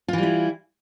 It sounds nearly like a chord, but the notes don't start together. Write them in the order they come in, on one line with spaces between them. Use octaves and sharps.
F4 E3 G3 E4